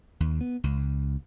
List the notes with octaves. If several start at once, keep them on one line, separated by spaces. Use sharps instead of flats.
D#2
B3
C#2